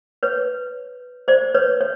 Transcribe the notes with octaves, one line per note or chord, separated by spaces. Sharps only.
B4 C#5
C5 D5
B4 C#5
C#5